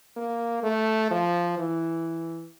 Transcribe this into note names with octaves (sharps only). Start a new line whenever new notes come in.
A#3
A3
F3
E3